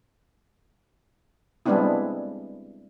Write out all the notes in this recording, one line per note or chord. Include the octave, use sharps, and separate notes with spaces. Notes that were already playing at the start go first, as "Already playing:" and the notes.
G3 G#3 B3 C4 D4 E4